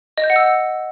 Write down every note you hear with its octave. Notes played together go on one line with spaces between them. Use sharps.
D#5
G6
F#5
E6